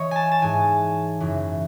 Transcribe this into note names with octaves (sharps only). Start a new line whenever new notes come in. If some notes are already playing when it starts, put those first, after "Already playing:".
Already playing: E3 C#5 D#5
G#5 A5
A5
G#2 E3 G#5
F#2 C#3 E3